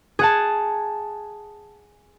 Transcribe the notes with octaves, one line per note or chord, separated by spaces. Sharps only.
G#4 F#5 A5